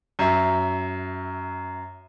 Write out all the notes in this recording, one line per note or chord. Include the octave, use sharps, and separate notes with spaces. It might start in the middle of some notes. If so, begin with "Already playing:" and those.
F#2 E5